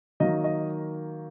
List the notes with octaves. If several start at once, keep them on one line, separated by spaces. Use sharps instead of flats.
D#3 F#3 A#3 D#5
D#5